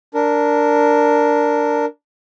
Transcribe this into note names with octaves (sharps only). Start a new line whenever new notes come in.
D4 A#4